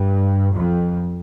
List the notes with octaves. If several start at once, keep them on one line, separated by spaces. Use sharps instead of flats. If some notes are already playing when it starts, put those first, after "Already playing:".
Already playing: G2
F2